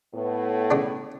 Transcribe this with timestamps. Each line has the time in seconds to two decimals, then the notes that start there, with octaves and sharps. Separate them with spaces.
0.14 A2 B3
0.71 C#3 D4